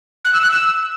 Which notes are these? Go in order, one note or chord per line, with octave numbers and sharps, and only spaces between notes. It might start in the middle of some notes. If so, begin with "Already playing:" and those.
F#6
E6
F#6
E6